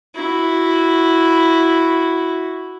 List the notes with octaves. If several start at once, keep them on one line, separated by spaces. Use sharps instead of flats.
E4 F#4